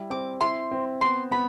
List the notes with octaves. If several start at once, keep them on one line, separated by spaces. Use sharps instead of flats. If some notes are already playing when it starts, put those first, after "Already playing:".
Already playing: G3 E4
C4 D6
E4 C6
C4
B3 C6
B3 B5